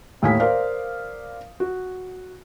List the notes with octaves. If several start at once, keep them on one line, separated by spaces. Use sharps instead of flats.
D#2 A2 F5 G#5 D#6 B6
A#4 C5 D5 F5
F#4